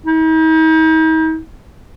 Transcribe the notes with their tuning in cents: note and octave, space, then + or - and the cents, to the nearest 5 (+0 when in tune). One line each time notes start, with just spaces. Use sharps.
D#4 +45